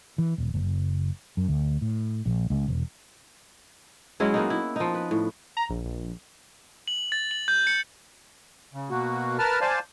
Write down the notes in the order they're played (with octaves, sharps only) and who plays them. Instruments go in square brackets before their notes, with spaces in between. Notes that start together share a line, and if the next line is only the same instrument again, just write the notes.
[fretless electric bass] E3
D#1
F#1
F#2
D2
A2
A#1
C#2
E1
[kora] F#3 G#3 C#4 E4
A#3 B3 D#4
E4
F3 D#4
B4
A2
[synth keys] A#5
A#1
A#1
[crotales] F#7
A6
F#7
G6
C#7
[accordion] C#3
B2 A#3 F#4
A#4 B4 A5 F6
C5 D5 F5 G#5 A5